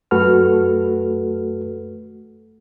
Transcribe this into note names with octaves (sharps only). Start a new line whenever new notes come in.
F#2 A3 F#4 A4 B4 F6